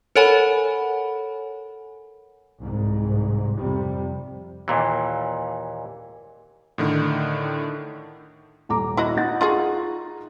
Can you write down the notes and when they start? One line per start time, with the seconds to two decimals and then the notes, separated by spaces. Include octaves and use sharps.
0.16 A4 A#4 C#5 F#5 G#5 B5
2.61 C2 G#2
3.58 F2 C3 G3
4.68 D#2 A#2 E3
6.78 A2 D3 D#3
8.69 D#1 A#5 D6
8.97 E4 F#4 D#5
9.17 D#4 F#5 A6
9.41 F4 F#4 G#4